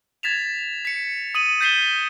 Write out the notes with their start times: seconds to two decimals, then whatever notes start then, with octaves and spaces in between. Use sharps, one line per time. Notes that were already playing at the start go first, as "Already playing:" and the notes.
0.23 G#6 A6 B6 E7 F7
0.85 B6 C#7
1.35 D#6 D#7 F#7
1.61 G6 A6 B6 C7 E7 G7